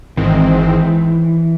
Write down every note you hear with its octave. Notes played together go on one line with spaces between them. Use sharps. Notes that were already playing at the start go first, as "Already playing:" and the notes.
G#1 G#2 D#3 E3 G#3 C4